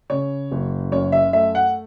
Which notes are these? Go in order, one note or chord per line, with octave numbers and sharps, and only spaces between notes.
C#3 C#5
F#1
F#2 C#5
E5
A3 E5
F#5